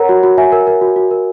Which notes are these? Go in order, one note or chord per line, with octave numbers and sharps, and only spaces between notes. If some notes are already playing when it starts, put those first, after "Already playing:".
Already playing: A#4 C#5 F#5 A#5
F#4
F#4
F#4 E5 G#5
A#4
A#4
F#4
F#4
A#4